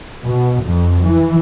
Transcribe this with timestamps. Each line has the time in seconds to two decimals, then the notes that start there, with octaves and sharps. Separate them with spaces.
0.25 B2
0.63 F2
1.03 E3